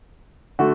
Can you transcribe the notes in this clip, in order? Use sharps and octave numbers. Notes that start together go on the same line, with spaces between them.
D3 A3 F#4